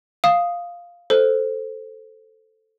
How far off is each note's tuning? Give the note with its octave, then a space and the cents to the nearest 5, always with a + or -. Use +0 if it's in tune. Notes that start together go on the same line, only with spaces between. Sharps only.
F5 +0 D#6 +0
A4 +0 C5 +0